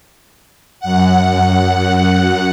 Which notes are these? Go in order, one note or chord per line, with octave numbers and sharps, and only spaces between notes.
F#2 F#5